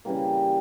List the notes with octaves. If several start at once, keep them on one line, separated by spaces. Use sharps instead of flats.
C#3 E3 G3 A#3